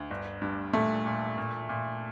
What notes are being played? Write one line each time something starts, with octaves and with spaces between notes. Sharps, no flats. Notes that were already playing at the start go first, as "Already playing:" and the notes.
Already playing: D2
G1
G2
A#2 A3
A#2
A#2
A#2